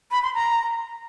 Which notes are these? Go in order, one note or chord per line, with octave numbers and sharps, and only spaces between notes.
B5
C6
A#5